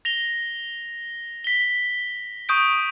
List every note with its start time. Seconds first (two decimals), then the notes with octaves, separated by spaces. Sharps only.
0.05 A#6 F7 G7
1.44 B6 G7
2.49 C#6 D#6 G6 D7